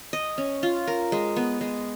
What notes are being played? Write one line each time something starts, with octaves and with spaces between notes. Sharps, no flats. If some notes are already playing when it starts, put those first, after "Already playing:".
D#5
C#4
F4
A#4
G#3
B3
G#3